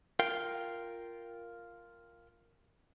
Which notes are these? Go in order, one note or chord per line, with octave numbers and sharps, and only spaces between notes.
F4 A#4 F5 G5